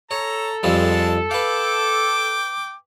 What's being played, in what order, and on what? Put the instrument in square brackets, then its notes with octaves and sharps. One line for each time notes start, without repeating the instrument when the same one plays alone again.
[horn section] A4 [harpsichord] C#5 [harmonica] A#5
[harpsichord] F2 F3 G3 [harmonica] G#3 A5
[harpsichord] B4 F5 [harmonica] G5 D6